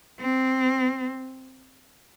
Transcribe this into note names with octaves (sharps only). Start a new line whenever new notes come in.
C4